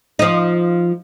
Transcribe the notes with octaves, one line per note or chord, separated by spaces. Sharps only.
F3 D#4